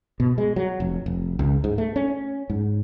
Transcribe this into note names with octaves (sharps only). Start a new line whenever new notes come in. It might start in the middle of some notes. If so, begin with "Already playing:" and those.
B2
G#3
F#3
F1
F1
C#2
G#2
A3
C#4
G#2